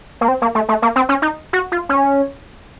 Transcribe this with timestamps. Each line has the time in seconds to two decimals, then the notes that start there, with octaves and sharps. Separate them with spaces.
0.21 A#3
0.28 C4
0.42 A#3
0.55 A3
0.69 A3
0.82 A#3
0.96 C4
1.09 C#4
1.22 D#4
1.53 F#4
1.72 F4
1.89 C#4